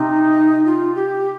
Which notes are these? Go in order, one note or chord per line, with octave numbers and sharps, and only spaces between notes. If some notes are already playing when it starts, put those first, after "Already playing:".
Already playing: C3 D#4
F4
G4